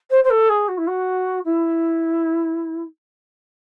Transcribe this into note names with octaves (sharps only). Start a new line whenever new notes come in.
C5
C5
A4
G#4
F#4
E4
F#4
E4